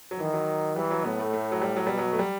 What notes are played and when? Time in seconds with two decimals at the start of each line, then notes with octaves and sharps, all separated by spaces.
0.11 F#3
0.19 D#3 E3
0.33 F#3
0.76 E3 G3
0.91 F#3
1.04 A2 B3
1.19 A3
1.33 A3
1.52 F#3
1.62 G3
1.76 F#3
1.87 B2 G3
1.98 F#3
2.12 A3
2.19 G3